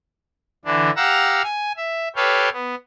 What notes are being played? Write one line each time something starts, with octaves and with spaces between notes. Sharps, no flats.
D3 E3 D4
G4 F5 F#5 A#5 E6
G#5
E5
G4 A4 B4 C#5 F5 G5
B3